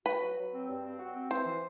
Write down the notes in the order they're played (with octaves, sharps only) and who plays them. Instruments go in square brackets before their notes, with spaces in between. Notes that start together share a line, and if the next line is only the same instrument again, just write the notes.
[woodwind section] F#4 [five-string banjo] B4
[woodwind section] F#3
F#3
C4
G2
C4
F#4
C4
[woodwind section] E3 [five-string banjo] C5
[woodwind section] E3